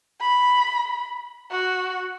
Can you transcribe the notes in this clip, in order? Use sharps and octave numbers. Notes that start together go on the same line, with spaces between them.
B5
F#4